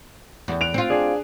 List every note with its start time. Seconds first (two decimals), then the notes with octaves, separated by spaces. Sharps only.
0.48 E2
0.61 F#6 D7 F7
0.74 C4 F4
0.90 D4 G#4